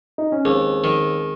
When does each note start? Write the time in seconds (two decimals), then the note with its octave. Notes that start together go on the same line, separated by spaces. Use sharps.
0.18 D#4
0.32 C#4
0.45 D#2 G#3 C4
0.84 D#3